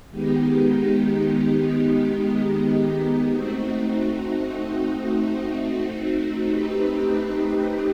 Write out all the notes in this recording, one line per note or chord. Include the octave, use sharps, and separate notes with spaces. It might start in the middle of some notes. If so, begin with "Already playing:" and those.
D#3 G#3 B3 D#4 G4
A3 C4 D#4 F#4
A3 C4 D#4 G4 B4